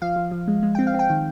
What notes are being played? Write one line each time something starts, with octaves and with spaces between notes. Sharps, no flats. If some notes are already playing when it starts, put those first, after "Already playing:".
F3 F5
F3
F3
G#3
G#3
C4 G5
F5
C4
G5
D#3